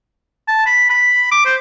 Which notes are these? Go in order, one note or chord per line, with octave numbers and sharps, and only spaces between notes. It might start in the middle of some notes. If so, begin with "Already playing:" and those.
A5
B5
B5
D6
C5